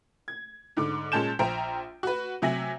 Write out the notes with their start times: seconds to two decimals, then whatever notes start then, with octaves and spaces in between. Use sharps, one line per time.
0.28 G#6
0.77 G#2 D3 D6
1.12 A#2 G#3 C#4 A5 G6 E7
1.39 A#1 C5 G5 A#5 D7
2.03 F#4 B4
2.42 C3 F#3 E5 G#5 A#6 F#7